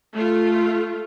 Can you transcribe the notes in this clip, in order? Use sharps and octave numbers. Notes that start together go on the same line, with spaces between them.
A3 F4